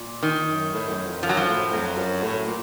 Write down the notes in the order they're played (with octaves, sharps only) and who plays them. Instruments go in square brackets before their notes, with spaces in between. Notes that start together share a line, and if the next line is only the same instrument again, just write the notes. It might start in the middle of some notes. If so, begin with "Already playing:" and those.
Already playing: [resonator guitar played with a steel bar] A#2
D#3
[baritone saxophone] F#2
A2
F#2
F2
[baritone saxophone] F#2 [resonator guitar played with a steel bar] F3
[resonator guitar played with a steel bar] F#3
F3
[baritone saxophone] A2
[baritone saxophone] F2 [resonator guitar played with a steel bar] F#3
[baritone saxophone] F#2
A2
A#2